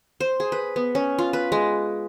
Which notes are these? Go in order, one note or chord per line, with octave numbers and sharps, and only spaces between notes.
C5
G#4
B4
B3
C#4
F4
B4
G#3